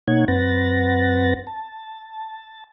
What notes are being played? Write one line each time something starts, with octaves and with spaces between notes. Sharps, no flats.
B2 A#3 D#4 C#5 F#5 G#6
F#2 C4 B4 F#5 A6 A#6
A5